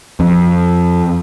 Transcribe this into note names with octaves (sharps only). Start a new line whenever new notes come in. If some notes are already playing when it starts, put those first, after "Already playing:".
F2